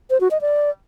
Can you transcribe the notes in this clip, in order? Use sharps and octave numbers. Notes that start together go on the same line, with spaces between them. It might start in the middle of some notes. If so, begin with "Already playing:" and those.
C5
F#4
D#5
D5